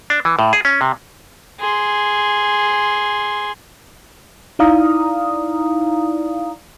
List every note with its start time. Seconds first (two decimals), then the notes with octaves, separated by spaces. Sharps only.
0.10 D4
0.25 E3
0.39 A2
0.53 G#4
0.65 C#4
0.81 C3
1.59 G#4 C6
4.59 D#4 E4 D5 F5 A#5 D#6